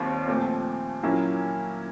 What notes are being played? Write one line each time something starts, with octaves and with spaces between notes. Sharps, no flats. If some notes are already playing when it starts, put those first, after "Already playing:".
Already playing: D#2 D#3 G3 C4 F4
A#2 F3 A3 C4
A#2 F#3 A#3 C#4 E4